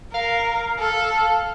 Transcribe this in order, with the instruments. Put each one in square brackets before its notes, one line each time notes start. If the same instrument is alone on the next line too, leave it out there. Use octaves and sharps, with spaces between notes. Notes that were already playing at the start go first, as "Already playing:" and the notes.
[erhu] A#4 [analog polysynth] F5
[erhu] A4